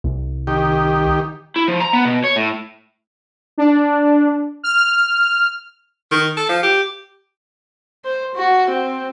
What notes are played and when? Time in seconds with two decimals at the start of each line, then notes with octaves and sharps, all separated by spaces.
0.04 C2
0.47 D#3 G4
1.56 E4
1.68 F3
1.80 A#5
1.93 B3
2.05 B2
2.24 C#5
2.36 A2
3.58 D4
4.63 F6
6.11 D#3
6.37 A4
6.49 F3
6.63 G4
8.05 C5
8.35 F#4
8.70 C4